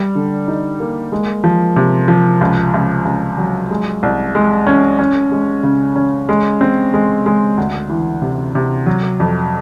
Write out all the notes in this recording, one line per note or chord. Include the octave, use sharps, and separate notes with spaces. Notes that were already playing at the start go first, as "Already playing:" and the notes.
Already playing: G3
D3
D#4
A#3
G#3
F3
C3
F3
C#2
C#2
C#2
F#3
G#3
C2
G#3
C#4
C#4
G#3
C#3
C#4
G#3
C4
G#3
G#3
D2
E3
C3
C3
F#3
F2